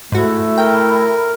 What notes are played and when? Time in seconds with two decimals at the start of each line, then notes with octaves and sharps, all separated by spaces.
0.12 G#2 A3 E4 F#4
0.58 A#4 G5